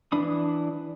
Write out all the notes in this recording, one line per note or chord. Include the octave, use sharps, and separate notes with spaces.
E3 D4 B5 D#6